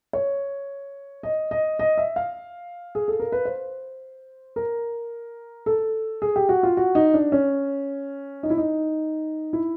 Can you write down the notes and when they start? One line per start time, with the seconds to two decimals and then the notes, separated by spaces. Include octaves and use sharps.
0.13 C#5
1.23 D#5
1.51 D#5
1.79 D#5
1.98 E5
2.16 F5
2.95 G#4
3.08 A4
3.20 A#4
3.32 B4
3.45 C5
4.56 A#4
5.66 A4
6.22 G#4
6.36 G4
6.49 F#4
6.63 F4
6.77 F#4
6.95 D#4
7.14 D4
7.32 C#4
8.43 D#4
8.50 E4
8.58 D#4
9.53 E4